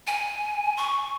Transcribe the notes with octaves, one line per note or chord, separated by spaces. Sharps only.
G#5
C#6